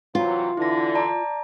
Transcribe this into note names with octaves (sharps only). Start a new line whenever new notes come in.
C3 E3 F#3 F4
D3 E3 E4 A#6
D5 A5 A#5